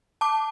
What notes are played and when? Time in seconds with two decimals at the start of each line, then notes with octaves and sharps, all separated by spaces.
0.21 A5 D6